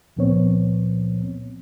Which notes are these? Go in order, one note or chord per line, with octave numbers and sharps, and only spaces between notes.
C#2 A#2 F3 B3 C4 C#5